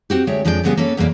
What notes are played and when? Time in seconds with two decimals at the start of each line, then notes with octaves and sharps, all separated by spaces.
0.10 C4 F#4 G4
0.27 D2 G#3 C#5 E5 G5
0.45 F2 F3 G#3 D4 B4 G5
0.63 A2 C#3 F#3 G#3 B3 G4
0.77 A#3 C#4 A4 B4
0.97 E2 B2 A3 A#3 D5